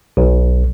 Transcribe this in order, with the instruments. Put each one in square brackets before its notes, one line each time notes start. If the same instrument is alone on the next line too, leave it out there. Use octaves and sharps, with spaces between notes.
[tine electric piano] B1